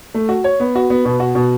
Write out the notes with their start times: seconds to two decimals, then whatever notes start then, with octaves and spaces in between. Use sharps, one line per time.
0.14 A3
0.29 F#4
0.44 C#5
0.60 B3
0.75 F#4
0.90 B3
1.05 B2
1.20 F#4
1.35 B2